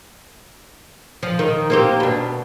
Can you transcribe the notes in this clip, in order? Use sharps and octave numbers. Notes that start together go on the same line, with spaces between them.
F3
D#3
A#3 C4 G4
B2 D4